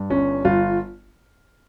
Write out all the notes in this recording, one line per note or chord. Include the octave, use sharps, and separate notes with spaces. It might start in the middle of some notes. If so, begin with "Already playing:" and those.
Already playing: G2
G1 C#4
G1 F4